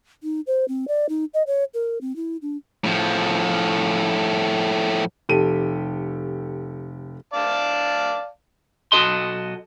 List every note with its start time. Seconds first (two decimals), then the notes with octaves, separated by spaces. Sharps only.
0.23 D#4
0.47 C5
0.68 C4
0.88 D5
1.09 D#4
1.34 D#5
1.47 C#5
1.74 A#4
2.01 C4
2.16 E4
2.42 D4
2.84 A2 F3
5.29 F1 G4 A4 D#7
7.34 D5 F5 A5
8.92 B1 G2 F#4 A4 D#5 C6